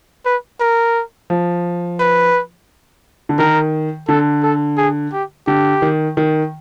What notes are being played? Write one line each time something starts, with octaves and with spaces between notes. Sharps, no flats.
B4
A#4
F3
B4
D3
D#3 A#4
D3 A4
A4
G#4
G4
D3 G4
D#3
D#3